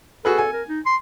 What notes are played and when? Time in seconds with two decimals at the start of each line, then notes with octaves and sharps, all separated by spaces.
0.25 F#4 G#4 A4 B4
0.38 G#5
0.53 A#4
0.68 D#4
0.86 C6